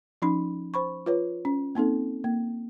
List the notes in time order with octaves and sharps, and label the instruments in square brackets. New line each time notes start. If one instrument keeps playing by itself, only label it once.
[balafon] F3 C#4 D#4 B5
C5 B5 C#6
F4 B4 C#5
C#4
A#3 C4 D#4 A4
A#3